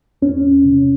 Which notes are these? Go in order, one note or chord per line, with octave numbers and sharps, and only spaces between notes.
E2 C#4
E2
C3